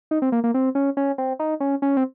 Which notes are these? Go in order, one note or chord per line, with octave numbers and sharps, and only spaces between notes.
D#4
C4
A#3
A#3
C4
C#4
C#4
C4
D#4
C#4
C#4
C4